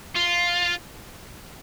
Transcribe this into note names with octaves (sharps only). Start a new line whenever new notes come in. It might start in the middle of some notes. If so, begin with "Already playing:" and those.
F4